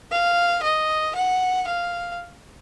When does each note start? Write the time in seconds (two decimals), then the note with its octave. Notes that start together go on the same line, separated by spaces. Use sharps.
0.11 F5
0.63 D#5
1.16 F#5
1.67 F5